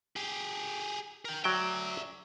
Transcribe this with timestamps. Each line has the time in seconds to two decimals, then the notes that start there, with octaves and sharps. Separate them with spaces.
0.16 G4 G#4
1.25 A#4 G5
1.44 F#3 D5 E5 G5